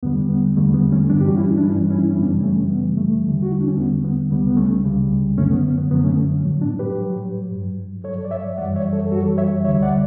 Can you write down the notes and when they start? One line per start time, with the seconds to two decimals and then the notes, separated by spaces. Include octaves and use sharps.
0.03 E2 D3 G3 B3
0.29 B3
0.57 E2 D3 G3 A3
0.74 B3
0.92 A3 C#4
1.09 G2 E3 G3 B3 D4
1.21 G4
1.29 F#4
1.36 C#4 E4
1.57 D4
1.63 G2 E3 G3 C#4 E4
1.90 C#4 E4
2.11 C#4
2.16 F#2 C#3 E3 G3 B3 D4
2.43 A3 C#4
2.70 F#2 C#3 E3 G3 B3
2.97 A3
3.24 E2 D3 G3
3.42 F#4
3.52 E4
3.60 D4
3.68 C#4
3.77 E2 D3 G3 B3
4.04 B3
4.30 C#2 C#3 G3 B3
4.47 B3
4.57 A3 C#4
4.84 C#2 C#3 G3
5.37 F#2 D3 F#3 A3 C#4
5.51 B3
5.64 B3
5.78 B3
5.91 F#2 D3 F#3 B3
6.04 A3 C#4
6.44 A2 F#3
6.61 B3 D4
6.79 G4 B4
6.98 A2 F#3
7.51 G2 F#3
8.04 G2 F#3 A4 C#5
8.25 D5
8.31 C#5 E5
8.58 F#2 E3 G3 D5 F#5
8.75 C#5 E5
8.93 A4 C#5
9.11 F#2 E3 G3 F#4 A4
9.38 C#5 E5
9.64 D2 D3 G3 C#5 E5
9.82 D5 F#5